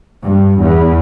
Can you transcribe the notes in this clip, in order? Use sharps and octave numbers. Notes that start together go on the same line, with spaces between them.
G2
E2